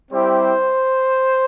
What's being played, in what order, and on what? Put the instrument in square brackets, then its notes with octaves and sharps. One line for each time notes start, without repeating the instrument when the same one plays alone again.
[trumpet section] G3 C4 E4 G4 C5